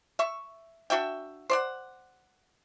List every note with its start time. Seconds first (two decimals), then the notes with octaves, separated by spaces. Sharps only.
0.19 E5 C#6
0.90 D4 F#4 E5 G5
1.50 C5 D5 F#5